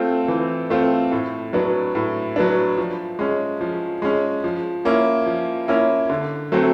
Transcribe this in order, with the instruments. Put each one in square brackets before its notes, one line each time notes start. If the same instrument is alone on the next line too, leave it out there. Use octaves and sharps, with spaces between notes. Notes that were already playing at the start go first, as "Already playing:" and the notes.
Already playing: [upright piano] A3 C4 F4
E3
A3 C4 F4
A2
F#3 B3 D4
A2
F#3 B3 D4
F3
G#3 C#4
F3
G#3 C#4
F3
A#3 C#4 E4
F3
A#3 C#4 E4
D3
F#3 A3 C4